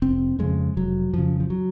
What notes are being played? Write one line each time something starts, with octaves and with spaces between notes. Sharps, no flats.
F1 C4
F2 C#3 G#3
F1 F#3
F2 C#3 F3
F3
F#3